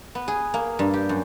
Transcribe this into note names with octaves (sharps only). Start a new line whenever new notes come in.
B3
G#4
A#3
G2
G4
F#2